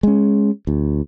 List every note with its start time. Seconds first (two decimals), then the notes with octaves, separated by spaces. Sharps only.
0.03 G#3 C#4
0.67 D2